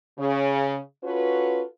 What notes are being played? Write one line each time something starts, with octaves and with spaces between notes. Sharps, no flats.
C#3
C#4 F4 F#4 A4 B4